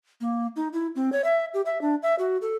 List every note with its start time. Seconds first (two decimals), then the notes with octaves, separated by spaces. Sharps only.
0.21 A#3
0.56 D#4
0.73 E4
0.96 C4
1.12 C#5
1.24 E5
1.54 G4
1.66 E5
1.81 D4
2.02 E5
2.19 F#4
2.42 A4